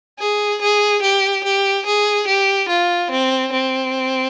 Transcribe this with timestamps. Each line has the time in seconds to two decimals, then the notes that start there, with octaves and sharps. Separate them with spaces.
0.19 G#4
0.61 G#4
1.02 G4
1.44 G4
1.86 G#4
2.27 G4
2.69 F4
3.10 C4
3.52 C4